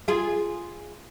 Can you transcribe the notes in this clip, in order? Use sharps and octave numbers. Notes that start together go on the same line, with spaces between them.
F4 G#4